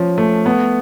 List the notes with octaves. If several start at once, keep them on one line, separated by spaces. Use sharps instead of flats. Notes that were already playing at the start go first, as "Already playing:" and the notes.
Already playing: F3 C#4
A3
B3